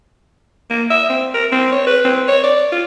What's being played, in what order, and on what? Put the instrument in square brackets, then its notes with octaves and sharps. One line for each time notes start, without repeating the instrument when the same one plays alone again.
[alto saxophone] A#3
E5
C4
A#4
C4
C#5
B4
C4
C#5
D5
F4